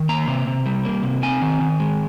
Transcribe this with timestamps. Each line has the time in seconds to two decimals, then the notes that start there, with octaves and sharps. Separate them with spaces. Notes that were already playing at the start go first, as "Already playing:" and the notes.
Already playing: D#3
0.09 A#3 A#5
0.28 C3
0.47 C3
0.66 G3
0.85 A#3
1.03 C3
1.23 C4 G#5
1.42 D#3
1.61 D#3
1.80 G#3